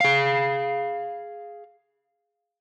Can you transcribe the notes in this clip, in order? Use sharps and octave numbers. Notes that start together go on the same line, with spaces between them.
G#4 F5